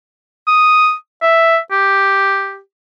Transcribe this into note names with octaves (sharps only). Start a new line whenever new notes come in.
D#6
E5
G4